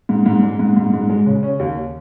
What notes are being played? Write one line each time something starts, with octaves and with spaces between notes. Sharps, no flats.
G#2
G#2
G#3
G#2
G#2
G#2
G#3
C#3
C#4
D#2